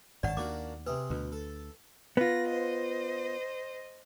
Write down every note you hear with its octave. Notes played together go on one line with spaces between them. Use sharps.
G#1 G2 C#5 D5 F#5 A5
D#2 A#3 D4 F#4 D6
C3 G#4 B4
D2 B2
A4
B3 F4 B4 A#6
C5 D#5